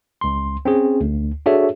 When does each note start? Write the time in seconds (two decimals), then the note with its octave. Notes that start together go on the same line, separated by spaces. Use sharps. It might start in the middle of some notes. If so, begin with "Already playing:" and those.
0.21 C#2 C6
0.65 C4 C#4 G#4
1.01 D2
1.46 D4 F#4 G#4 A4 C#5 E5